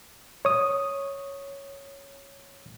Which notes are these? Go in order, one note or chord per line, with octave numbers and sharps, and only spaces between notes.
C#5 D#6